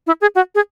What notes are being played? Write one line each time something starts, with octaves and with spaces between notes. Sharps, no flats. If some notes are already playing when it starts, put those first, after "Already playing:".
E4
G#4
F#4
G#4